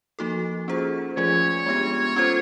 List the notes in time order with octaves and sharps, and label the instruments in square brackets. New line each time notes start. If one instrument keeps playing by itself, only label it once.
[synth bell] F3 A#3 D#4 F#4 A4
A#3 C#4 F4 G#4 C5
[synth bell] F3 A3 C#4 F4 G#4 [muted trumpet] C#5
[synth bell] G#3 B3 D4 G4
C#4 F4 A4 C5